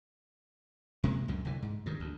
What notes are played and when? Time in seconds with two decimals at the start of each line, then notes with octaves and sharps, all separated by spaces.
1.04 C3 G#3 A#3
1.28 C#2 F#2 A#2 D3
1.45 C2 D3 E3
1.62 G#2
1.86 G2 D#3
2.00 D2